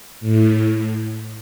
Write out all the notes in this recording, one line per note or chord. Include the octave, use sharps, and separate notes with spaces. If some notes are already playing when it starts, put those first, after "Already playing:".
A2